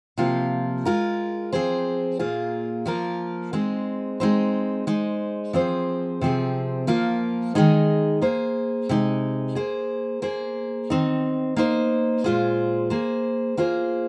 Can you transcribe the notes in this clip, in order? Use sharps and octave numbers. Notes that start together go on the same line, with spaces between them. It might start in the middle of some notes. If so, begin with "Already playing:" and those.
C3 F3 A#3 F4
G#3 F4 A#4
F3 C4 G#4 C5
A#2 A#3 F4 G#4
F3 A#3 F4 A#4
G#3 C4 D#4
G#3 C4 D#4 C5
G#3 D#4 C5
F3 C4 G#4 C5
C3 F3 C4 G#4
F3 A#3 F4 A#4
D#3 G#3 D#4 G#4
A#3 G#4 C5
C3 G#3 D#4
A#3 G#4 C5
A#3 G#4 C5
D#3 C4 D#4
A#3 D#4 C5
A#2 G#3 F4 G#4 C5
A#3 G#4 C5
A#3 F4 G#4 C5